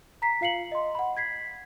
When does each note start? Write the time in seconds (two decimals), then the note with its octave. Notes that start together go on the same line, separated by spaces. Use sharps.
0.22 A#5 B6 C7
0.41 F4 F5 C7 C#7 F#7
0.72 D#5 C6
0.95 F#5 B5
1.17 G#6 B6 C7